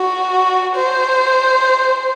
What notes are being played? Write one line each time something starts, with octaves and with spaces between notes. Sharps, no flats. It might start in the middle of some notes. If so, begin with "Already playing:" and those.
Already playing: F#4
C5